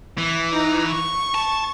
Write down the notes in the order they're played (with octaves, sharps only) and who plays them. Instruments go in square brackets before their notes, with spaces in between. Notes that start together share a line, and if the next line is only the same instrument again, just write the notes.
[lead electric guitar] E3
[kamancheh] D#4 A#5
C#6
[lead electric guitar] A5